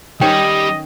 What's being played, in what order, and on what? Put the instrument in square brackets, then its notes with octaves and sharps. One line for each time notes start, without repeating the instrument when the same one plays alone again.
[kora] D#3 C#4 [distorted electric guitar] G3 [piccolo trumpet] D#5 [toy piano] G5